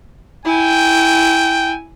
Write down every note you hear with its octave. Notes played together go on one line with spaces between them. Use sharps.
E4 G5 G#5